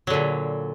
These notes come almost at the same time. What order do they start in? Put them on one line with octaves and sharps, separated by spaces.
F#3 D3 A#2